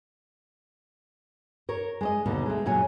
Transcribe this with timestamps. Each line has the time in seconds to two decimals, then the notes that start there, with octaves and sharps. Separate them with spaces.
1.69 A#4 C#5
2.01 G#3 D5 D#5
2.26 D#2 B2 D3
2.46 G#3 A3
2.66 F#2 A#2 C#3 F#3 G#5